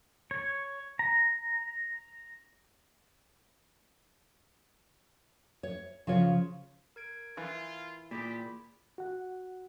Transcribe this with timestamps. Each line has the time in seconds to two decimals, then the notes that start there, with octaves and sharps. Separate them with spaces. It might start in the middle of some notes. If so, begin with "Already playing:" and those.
0.31 C#5
0.99 A#5
5.63 C#5
6.07 C#3 F3 F4 C#5
6.96 A#4 G#6 D7
7.37 E3 F4
8.11 A#2 G4 G#4 B5 B6
8.98 F#4 F#5